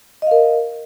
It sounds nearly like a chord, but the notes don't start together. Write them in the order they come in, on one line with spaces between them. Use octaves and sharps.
D#5 F5 A#4